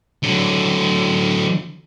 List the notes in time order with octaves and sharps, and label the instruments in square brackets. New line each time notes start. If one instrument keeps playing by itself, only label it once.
[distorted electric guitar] D3 F#3